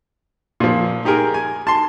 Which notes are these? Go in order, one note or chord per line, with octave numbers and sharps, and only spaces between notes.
A#2 F3
D#4 G4 G#4 A#4
G#5
A5 C6